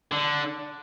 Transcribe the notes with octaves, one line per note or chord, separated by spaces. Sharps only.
D3